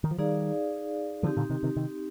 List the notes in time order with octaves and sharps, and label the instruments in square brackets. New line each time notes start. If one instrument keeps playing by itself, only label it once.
[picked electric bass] D#3
F3
[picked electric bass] D#3 G3 [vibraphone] D#4 G#4 D5 F5
[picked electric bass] D3 F3 [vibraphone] C4 D#4 G4
[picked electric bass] A#2 D3
C3 D#3
C3 D#3
C3 D#3